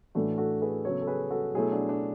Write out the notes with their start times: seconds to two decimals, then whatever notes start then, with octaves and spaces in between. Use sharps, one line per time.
0.15 A2 E3 A3 D4 F#4
0.38 F#4 A4
0.62 G#4 B4
0.84 C#3 F#3 B3 A4 C#5
1.02 A4
1.07 G#4 B4
1.31 F#4 A4
1.54 B2 F#3 A3 E4 G#4
1.72 D4 F#4
1.89 D4